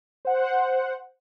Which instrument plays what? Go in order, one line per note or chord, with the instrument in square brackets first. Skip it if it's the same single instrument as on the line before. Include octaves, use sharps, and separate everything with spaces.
[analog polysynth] C5 F#5